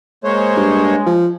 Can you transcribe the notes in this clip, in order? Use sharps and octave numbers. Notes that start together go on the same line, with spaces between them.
G#3 A#3 C5 C#5
G2
F3